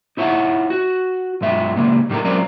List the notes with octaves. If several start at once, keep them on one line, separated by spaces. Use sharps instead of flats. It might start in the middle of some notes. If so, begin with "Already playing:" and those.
D#4 E4 C#5 E5 F#5
F#4
B1 G2 G#3 E5
C#3 G3 G#3 A#3
A2 G3 D#4 A4 A#4
F#3 G#3 C4 C#4 A#4 D5